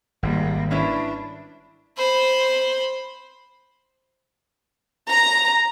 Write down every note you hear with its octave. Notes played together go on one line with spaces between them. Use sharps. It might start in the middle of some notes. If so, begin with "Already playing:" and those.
G#1 G3 A#3
C#4 D4 E4 B4
C5 B5
A#5